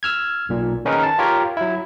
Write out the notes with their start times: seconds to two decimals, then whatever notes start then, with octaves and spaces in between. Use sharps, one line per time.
0.03 E6 F6 G#6
0.49 B1 A#2
0.85 D#3 C#4 D#4 G#4 A#4 B4
1.03 A5
1.18 F4 G4 A#4 C#5
1.57 F#3 E4